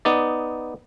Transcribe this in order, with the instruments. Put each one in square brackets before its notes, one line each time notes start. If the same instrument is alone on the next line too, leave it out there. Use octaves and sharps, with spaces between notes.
[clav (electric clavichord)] B3 D#4 D5